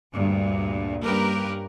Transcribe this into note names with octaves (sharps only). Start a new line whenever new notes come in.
D2 G2 A#2
G2 A#3 C#4 G4 A#4 B4